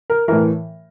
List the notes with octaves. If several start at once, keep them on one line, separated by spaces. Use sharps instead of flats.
A#4
A2 E3 A#4